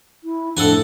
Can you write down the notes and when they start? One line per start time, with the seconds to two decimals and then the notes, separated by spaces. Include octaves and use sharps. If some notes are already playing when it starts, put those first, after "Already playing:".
0.24 E4
0.57 F2 A2 D4 A4 F#5 G#5